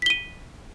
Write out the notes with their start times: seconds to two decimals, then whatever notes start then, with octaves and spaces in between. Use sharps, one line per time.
0.02 B6
0.06 G7
0.10 D#7